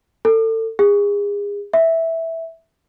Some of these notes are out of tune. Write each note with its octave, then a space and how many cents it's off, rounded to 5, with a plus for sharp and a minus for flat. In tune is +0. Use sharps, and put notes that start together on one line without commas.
A4 +30
G#4 -35
E5 -10